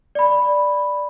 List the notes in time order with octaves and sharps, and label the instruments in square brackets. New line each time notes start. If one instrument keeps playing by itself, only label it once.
[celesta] D5 B5